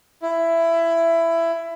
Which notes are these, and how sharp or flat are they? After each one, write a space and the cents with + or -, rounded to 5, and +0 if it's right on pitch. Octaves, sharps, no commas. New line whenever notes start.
E4 +15